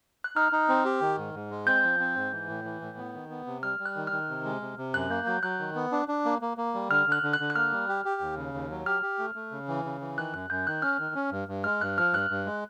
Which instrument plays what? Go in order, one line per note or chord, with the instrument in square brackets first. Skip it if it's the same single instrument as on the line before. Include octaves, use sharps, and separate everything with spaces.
[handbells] F#6
[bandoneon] D#4 [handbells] F6
[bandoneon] D#4
C4
G4
D#3
G#2
G#2
G#3
[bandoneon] C4 [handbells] G6
[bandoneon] F3
C4
G#2
E3
A2
E3
A2
B3
D#3
B3
C3
[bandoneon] G3 [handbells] F6
[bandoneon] G3
[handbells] F#6
[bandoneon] D#3
[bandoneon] D#3 [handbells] F6
[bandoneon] C3
G#3
C3
C3
[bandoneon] F#2 [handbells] F#6
[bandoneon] A#3 [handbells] G6
[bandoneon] F#3 [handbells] G6
[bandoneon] F#3 [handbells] F#6
[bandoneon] D#3
B3
D4
D4
A#3
A#3
A#3
G3
[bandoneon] D3 [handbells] F6
[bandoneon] D3
[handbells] F#6
[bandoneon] D3
[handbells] F#6
[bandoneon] D3
[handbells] F#6
[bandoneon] A#3 [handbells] F6
[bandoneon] G3
G4
G4
D#2
C#3
D#2
F#3
[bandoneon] G4 [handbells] F6
[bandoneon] G4
A3
A3
C#3
E3
C#3
E3
[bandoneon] D#3 [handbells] F#6
[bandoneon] F#2 [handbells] F#6
[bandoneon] F#2 [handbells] G6
[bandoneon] D#3 [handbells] F#6
[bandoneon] C#4 [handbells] F6
[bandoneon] D#3
C#4
G2
G2
[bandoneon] G#3 [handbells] F6
[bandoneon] G2 [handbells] F#6
[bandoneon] F3 [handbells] F6
[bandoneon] G2 [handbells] F#6
[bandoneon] G2
G#3